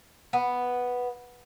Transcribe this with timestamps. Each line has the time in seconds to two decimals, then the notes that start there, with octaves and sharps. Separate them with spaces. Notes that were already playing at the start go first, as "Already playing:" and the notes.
0.33 B3